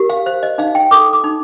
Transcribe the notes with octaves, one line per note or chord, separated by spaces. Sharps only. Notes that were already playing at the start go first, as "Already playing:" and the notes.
Already playing: G4 A#4
F5
C5 F5
D#5
D#4 F5
G5
A4 D6
D6
D#4